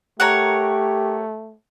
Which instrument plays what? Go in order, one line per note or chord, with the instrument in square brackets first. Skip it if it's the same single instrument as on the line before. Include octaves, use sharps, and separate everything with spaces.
[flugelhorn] A3 [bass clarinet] G4 [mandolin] A#4 C#5 F#5